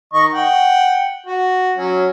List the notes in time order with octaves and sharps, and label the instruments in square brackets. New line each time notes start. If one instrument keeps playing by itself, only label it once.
[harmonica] D#3 D#5 C#6
F#5 G5
F#4
F#3 C#4